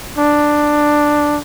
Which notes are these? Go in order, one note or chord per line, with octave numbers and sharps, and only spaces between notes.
D4